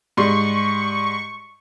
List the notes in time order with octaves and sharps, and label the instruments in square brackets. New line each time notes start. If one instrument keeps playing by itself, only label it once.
[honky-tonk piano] G#2 G3 C6 [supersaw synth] C#6